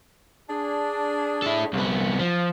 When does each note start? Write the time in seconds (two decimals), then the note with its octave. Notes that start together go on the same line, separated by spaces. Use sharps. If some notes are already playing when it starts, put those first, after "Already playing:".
0.49 D4 G#4
1.42 E4 A4
1.73 C2 B3
2.20 F3